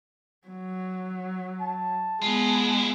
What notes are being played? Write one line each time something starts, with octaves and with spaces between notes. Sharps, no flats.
F#3
A5
G#3 B3 E4 F4